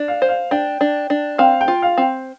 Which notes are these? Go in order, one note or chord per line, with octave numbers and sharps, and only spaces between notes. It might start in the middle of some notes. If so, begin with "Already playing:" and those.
Already playing: D4
F5
C5
F5
D4 G5
D4
D4
C4 F5
G5
F4
F5
C4